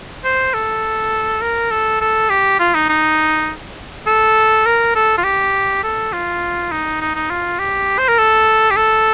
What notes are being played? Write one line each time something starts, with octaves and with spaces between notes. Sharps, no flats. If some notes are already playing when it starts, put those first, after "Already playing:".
C5
A4
A#4
A4
A4
G4
F4
D#4
D#4
A4
A#4
A4
F4
G4
A4
F4
D#4
D#4
D#4
F4
G4
C5
A#4
A4
G4
A4